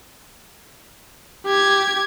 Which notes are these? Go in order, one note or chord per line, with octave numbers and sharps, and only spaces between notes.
G4 G#6